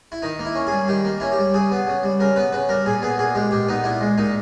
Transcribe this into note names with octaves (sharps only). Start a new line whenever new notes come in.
E4
D#3 D#4
A#3
E4
C#4
G#4
G3
D#3 G4
A#3
C#4 E4
G4
G3
C#3 G#4
B3
C#3
G3
C#3 A#4
B3 B4
C#3 B4
G3 A#4
A#2 G#4
B3 G#4
A#2 G#4
G#3 G4
A#2 G4
B3 D#4
A#2 E4
G#3
A#2 D#4